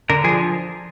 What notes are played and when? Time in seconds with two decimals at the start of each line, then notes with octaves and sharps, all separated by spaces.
0.10 D3 A#4
0.24 F3 G#4